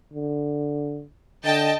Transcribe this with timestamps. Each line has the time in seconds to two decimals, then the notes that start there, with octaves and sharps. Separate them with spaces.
0.13 D3
1.45 D3 D#5 G5 A5